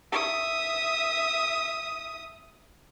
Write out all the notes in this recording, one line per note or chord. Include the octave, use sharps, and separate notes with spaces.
E5 D#6